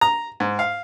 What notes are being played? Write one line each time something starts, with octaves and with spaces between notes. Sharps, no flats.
A#5
G#2
F5